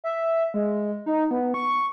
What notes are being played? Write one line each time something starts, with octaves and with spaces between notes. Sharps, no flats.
E5
G#3
D#4
B3
C#6